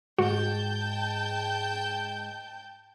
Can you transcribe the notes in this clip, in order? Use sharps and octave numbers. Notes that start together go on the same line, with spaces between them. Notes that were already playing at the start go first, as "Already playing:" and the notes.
G#2 F#4 G5 A5 G6